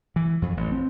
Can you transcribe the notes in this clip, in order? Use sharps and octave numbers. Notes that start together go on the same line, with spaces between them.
E3
F2
A1
C4